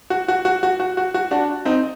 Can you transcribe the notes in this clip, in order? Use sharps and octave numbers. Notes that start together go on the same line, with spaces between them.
F#4
F#4
F#4
F#4
F#4
F#4
F#4
D4 F#4
C4 D#4